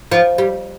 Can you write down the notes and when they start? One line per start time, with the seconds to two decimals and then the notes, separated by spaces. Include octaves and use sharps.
0.12 F3
0.38 G3